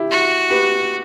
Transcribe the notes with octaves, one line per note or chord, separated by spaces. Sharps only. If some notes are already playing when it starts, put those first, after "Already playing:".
Already playing: E4 G4
F#4
G4 B4